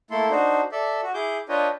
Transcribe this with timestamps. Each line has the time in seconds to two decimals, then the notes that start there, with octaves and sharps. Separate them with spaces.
0.11 A3 A#3 E4 A4 C6
0.30 D4 D#4 F#4 C5
0.72 A4 D5 E5
1.03 F#4
1.14 E4 G#4 D6 G6
1.49 D4 F4 B4 C#5 D#5 G5